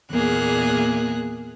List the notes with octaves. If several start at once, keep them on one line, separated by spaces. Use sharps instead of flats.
E2 A#2 A#3 G#4 F#6